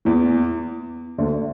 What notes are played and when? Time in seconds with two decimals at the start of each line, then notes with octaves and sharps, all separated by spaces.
0.05 E2 E3
1.18 D2 D3